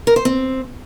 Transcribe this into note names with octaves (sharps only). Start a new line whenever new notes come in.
A#4
C5
C4